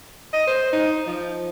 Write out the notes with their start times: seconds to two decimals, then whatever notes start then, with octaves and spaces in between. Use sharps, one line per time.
0.33 D#5
0.47 C5
0.73 D#4
1.07 F3